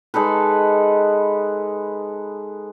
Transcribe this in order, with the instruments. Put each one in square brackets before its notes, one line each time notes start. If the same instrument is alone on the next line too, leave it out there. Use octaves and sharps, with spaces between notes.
[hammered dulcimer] G#3 D#4 A4 B4